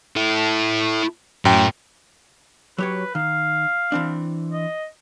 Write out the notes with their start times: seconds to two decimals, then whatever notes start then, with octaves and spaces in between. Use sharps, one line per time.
0.17 E4 A4
1.45 F#2 A2 G5
2.78 F#3 G4 B4 C#5
3.15 D#3 F5
3.92 E3 C4 D4
4.53 D#5